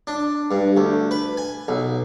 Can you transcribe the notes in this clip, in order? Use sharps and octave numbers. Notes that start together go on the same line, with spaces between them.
D4
G2
D2
B4
G#5
B1